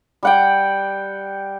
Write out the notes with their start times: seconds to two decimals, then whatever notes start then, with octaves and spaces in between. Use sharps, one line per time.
0.23 G3 F#5 G5